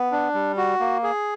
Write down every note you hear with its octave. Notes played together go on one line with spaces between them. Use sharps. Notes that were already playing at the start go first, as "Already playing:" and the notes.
Already playing: B3
D4
G3
F#4
A#3
G#4